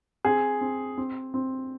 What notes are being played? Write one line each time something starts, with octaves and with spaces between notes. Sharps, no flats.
C4 G#4
C4
C4
C4